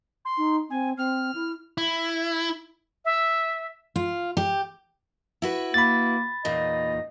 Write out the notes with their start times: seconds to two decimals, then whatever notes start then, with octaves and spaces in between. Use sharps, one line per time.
0.25 C6
0.38 D#4
0.70 C4 G#5
0.98 C4 F6
1.35 E4
1.78 E4
3.05 E5
3.96 F4
4.37 G4
5.42 E4 F#4 B4
5.74 A#3 B5 A6
6.45 E2 A#2 D#4 D#5